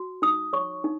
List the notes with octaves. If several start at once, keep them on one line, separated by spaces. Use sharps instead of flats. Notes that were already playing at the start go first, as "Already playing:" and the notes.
Already playing: F#4
D#4 D#6
C#5 C#6
D#4